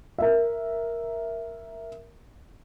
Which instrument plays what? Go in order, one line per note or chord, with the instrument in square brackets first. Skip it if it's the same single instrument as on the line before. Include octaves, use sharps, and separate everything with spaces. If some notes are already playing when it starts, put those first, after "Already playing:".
[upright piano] A#4 E5